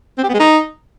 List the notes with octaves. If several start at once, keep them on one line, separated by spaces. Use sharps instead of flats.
C4
G4
B3
G#3
D#4